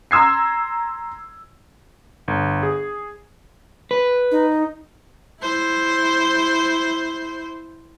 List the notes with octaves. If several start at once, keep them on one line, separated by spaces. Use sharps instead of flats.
A#5 C6 E6 G#6 C7
G1
G#4
B4
D#4
E4 C5